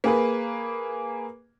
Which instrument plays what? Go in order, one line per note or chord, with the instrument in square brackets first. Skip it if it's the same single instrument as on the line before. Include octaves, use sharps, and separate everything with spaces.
[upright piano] A#3 G#4 B4